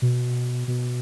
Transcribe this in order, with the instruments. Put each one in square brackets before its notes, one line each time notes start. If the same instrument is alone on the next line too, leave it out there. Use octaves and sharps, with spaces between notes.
[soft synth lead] B2
B2